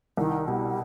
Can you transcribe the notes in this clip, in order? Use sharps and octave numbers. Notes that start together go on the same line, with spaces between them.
C2 D#3
B2 G3